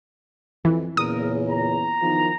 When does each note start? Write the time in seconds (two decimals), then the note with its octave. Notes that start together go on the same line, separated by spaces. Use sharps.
0.65 F2 E3
0.97 E2 A#2 C#3 A#4 D#6
1.49 A#5
2.01 E2 D#3 F3